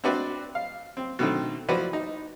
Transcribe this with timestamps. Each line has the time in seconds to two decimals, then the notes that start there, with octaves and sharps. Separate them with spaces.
0.04 C4 D4 F#4 B4 D5
0.55 F5
0.97 C4
1.19 B2 D3 D#3 A3 C4
1.69 F3 E4 F#4 B4 D5
1.93 D#4